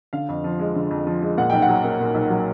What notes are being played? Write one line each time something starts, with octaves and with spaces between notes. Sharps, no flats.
D3 F5
F2
F3
G#3
D3
F2
F3
G#3
A#2 F#5
B1 G5
F#5
F#3
A#3
A#2
B1
F#3